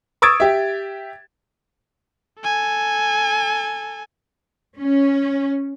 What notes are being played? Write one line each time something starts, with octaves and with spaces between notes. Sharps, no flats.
C#6 D#6 E6 G#6 A6 D7
G4 E5
A4 G#5
C#4